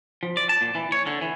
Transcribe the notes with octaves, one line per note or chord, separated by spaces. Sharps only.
F3
D5
A5
A#2
E3
C#5
D3
E3